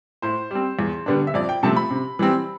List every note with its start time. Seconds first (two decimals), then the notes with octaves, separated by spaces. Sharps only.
0.22 A2 C5
0.51 G3 C4
0.79 E2
1.06 D3 G3 B3 D4
1.27 E5
1.34 F2 D5
1.49 G5
1.63 C3 F3 A3 C4 A5
1.77 B5
1.91 C3
2.19 E3 G3 C4